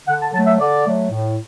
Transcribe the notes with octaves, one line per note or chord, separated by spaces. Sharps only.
D3 F#5
A5
F#3 A3 A5
E5
D3 D5
F#3 A3
A2